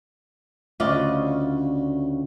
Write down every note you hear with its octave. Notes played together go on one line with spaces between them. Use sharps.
D2 C#3 F4 D5 D#5